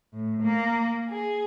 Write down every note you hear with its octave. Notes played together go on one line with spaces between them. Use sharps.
A2
A#3
G#4